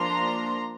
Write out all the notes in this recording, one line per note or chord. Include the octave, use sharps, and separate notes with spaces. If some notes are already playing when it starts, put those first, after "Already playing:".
Already playing: F3 A#3 D4 A#5 C6